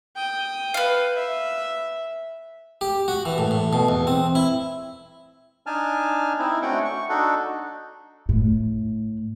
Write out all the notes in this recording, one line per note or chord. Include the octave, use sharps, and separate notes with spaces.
G5 D#6
B4 F5
E5
G4
F#4
E3
A2
A2
B2
E2
C4
E4
D4 D#4 G#5 A5 F6
C4 D#4 E4
A3 C#4 D4 F#4 F#5 G5
C#6
D4 D#4 F#4 A4
A2